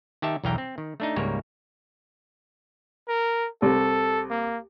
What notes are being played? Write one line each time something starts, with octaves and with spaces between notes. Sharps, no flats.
D#3 G4 E5 A5
B1 E2 E3 F5 G5 A#5
C4
D#3
A3 D4 D#4
C#2 G#2 G3 A#3 C#5
A#4
C2 A4
A#3